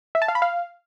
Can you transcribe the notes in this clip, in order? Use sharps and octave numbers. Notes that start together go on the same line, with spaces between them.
E5
A5
F5
B5
F5